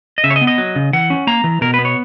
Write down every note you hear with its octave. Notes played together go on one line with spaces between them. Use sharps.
D#5
C#3 E5
C#5
D#5
B3
D#5
F#3
C#3
E3 F#5
C#4
A#3 A#5
E3
B2 A#4
B4
B3
C#5